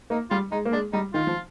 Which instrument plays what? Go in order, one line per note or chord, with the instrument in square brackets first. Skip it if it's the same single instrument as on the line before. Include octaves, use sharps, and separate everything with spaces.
[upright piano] A#3 [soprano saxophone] D#4
[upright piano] G3 [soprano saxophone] F4
[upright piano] G#3 [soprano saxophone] D#4
[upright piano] A#3
[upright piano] G#3 [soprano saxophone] D4
[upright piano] G3 [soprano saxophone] D#4
[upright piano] D#3 [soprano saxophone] F4
[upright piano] F3